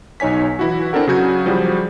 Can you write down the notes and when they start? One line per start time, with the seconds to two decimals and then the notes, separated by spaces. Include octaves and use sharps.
0.20 B1 D#4 C#5 G#5 B6
0.59 E3 E4 F#4
0.93 C4 D4 E4 A4 A#4 F#5
1.07 C#3 F#3 F#4 G6 G#6
1.46 F3 G3 E4 F#4 G#4